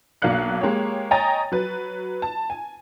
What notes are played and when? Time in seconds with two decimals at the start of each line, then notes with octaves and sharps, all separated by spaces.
0.22 B1 A#3 D4 F5 F#6 C#7
0.61 G#3 A#3 G4 C#5
1.11 C#5 D#5 G5 G#5 A#5 A6
1.52 F#3 B4
2.22 A5
2.50 G#5